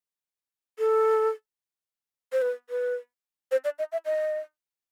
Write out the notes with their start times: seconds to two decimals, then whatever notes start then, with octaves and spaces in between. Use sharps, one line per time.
0.79 A4
2.32 C5
2.42 B4
2.70 B4
3.51 C5
3.65 D5
3.79 D#5
3.92 E5
4.06 D#5